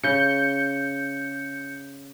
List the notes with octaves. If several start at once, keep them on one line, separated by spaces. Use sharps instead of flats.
C#3 G6 C#7